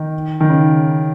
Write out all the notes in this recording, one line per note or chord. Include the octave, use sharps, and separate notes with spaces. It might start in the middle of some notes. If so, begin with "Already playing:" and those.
Already playing: D#3
D#3
C#3